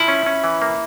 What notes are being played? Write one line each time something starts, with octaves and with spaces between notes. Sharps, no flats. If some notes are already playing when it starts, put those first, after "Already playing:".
Already playing: F3 E4
C#4
C#4
E3
A#3